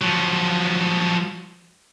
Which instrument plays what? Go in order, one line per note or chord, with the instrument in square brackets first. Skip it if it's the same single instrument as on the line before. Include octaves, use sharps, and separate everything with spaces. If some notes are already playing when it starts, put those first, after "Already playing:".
[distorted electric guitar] F3 F#3